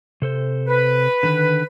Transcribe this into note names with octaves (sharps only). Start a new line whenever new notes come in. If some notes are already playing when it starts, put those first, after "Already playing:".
C3 A4 C5
B4
D3 D#3